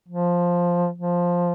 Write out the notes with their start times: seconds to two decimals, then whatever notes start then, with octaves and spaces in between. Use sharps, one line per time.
0.08 F3
0.98 F3